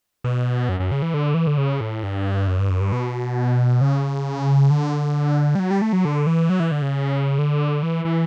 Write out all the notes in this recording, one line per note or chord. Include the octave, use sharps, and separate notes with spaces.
B2
F#2
F#2
C#3
E3
D3
E3
D3
C#3
A2
G2
F#2
G2
F#2
G2
B2
C#3
D3
G3
F#3
G3
A3
F#3
D3
E3
F#3
E3
D3
C#3
D3
E3
E3